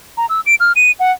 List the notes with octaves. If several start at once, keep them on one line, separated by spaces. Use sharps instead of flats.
A#5
E6
D7
F6
D#7
F#5